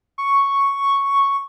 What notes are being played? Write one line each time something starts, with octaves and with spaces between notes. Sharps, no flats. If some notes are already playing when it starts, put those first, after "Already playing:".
C#6